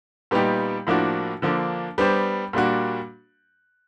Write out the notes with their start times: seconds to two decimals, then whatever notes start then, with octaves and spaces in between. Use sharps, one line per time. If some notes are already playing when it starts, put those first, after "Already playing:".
0.31 A#2 G3 B3 D#4 G4
0.87 A2 F3 A#3 D4 F#4
1.42 D3 F3 A#3 D4
1.98 G3 B3 D4 G4 C5
2.53 A#2 G3 A#3 D4 F#4